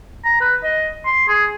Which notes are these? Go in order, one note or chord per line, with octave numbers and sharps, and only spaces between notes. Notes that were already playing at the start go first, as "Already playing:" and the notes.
A#5
B4
D#5
C6
G#4